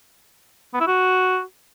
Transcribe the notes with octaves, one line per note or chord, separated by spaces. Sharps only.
B3
E4
F#4